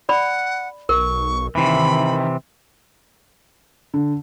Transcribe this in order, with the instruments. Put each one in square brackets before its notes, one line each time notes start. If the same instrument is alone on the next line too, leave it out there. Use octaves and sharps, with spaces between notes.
[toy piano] D5 B5 [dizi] F#5
[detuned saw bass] B1 [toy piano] A#4 [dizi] C#6
[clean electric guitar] C3 E3 [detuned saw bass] D#3 [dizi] B5
[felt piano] D3